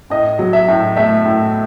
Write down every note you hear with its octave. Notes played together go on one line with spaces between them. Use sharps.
A2 D#5
F#3
E5
A2
A3 E5
A2